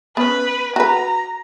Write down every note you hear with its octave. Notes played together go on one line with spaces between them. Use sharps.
B3 C#4 B4
F#4 B4 A#5